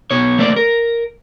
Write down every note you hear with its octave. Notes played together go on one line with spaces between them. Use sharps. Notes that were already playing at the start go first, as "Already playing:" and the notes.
B1 B2 C#5
A3 A#3 C4 D5
A#4